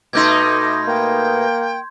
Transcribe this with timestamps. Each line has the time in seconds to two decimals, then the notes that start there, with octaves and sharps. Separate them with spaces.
0.13 B2 A3 D#4 C6 D6 G6 G#6
0.87 A#3 G5